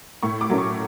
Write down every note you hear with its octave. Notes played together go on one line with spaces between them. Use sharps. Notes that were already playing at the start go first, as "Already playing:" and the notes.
A2 C#6
D6
F#3 A3 C#4
C#6